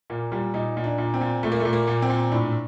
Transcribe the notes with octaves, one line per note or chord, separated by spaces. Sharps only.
A#2 A#3
A#2 G3
A#2 D#4
A#2
D4
A#2
C4
A#2
A#2 A3
A#3
A3
A#2
A#3
A#2
C4
A#2
A2 D4